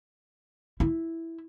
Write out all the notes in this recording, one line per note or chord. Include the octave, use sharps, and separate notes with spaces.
E4